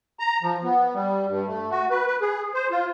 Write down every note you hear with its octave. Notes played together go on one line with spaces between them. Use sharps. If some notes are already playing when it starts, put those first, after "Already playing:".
A#5
F3
B3
G3
G2
A3
F#4
B4
B4
G#4
C5
F4